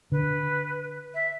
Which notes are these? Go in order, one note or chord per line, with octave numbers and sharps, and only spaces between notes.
D3 B4
E5